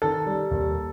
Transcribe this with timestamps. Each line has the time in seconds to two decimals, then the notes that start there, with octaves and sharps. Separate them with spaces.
0.02 D#3 A4
0.26 G3
0.51 D#2